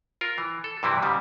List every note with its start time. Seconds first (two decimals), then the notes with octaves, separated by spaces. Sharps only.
0.21 F4 A#4
0.38 E3
0.64 A4
0.83 G2 C3 E3 C4 E4
1.02 G#2 C#3 G3